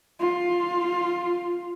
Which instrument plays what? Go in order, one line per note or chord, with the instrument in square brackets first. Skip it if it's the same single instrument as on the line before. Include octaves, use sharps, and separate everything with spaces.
[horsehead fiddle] F4